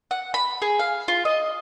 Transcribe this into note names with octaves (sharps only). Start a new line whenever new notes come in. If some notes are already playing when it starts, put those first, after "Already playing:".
F#5
B5
G#4
F5
F4
D#5